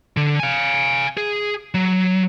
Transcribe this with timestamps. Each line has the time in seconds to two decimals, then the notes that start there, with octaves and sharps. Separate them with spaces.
0.17 D3
0.40 F5 G#5
1.17 G#4
1.74 F#3